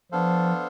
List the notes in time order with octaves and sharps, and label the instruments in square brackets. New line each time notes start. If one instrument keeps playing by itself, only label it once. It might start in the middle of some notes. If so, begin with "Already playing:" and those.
[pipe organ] F3 [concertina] B3 D4 A4 C5 F5